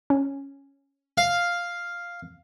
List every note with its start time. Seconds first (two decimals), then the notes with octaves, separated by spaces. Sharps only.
0.10 C#4
1.18 F5